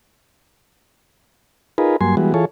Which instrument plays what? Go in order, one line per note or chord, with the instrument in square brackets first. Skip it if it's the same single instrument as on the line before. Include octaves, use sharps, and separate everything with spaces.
[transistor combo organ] D#4 F4 G#4 A#4 B4
G2 F#3 A#3 G#5 C6
E3 G3 G#3 B3 F#4
E3 F4 G#4 A4 C#5